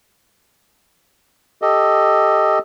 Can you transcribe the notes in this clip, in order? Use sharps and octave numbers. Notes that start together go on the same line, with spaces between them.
G4 A4 D#5